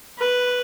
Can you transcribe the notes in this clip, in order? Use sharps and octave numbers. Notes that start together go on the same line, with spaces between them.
B4